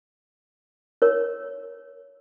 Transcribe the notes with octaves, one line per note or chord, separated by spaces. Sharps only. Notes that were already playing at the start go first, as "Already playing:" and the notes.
A#4 C#5